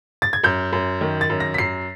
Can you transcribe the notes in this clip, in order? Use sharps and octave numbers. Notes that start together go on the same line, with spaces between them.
A6
G#6
F#2 G6
F#2
D#3
A6
F#2
A#6
B6
F#2 C7